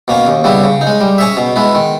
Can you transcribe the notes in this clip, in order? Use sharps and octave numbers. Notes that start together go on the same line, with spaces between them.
B2 A#3 C#4
D#2
C#3 G3 B3 E4
C#3
D#4
G#3
G3
C#4 G#4 C#5 E5
B2
G#3 B3 E4
D#3